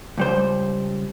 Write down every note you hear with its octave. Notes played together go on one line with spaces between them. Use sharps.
C#2 G3 C5